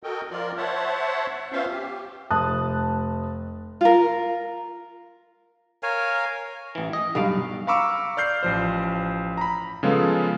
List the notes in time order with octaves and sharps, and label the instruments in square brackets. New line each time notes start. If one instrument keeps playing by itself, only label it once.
[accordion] F#4 A4 A#4 D#5 G5
F3 F4 A#4 D5
C5 C#5 E5 F#5 A5
B3 C#4 F4 C5 E5 F5
G4
[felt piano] F1 A5 D#6 F#6
[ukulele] F4 A#4
[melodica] A#4 C#5 F5 G#5
[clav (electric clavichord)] A1 E3
D#5
[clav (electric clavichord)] B1 [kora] G2 D5 F5
[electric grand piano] F5 A#5 B5 C#6 D6 E6
D5 F6 G6 C7
A1 F3 C5
A#5 B5
C#3 F3 G#3 B3 F4 A4